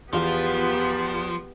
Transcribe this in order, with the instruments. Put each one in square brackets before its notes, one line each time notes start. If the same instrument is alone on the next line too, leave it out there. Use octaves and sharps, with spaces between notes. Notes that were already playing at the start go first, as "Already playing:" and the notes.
[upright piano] E2 F4 [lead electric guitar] F3 [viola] B3 G4